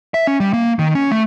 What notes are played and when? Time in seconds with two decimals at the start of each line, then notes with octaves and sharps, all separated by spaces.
0.14 E5
0.27 C#4
0.40 G3
0.53 A#3
0.79 D#3
0.95 C#4
1.11 A3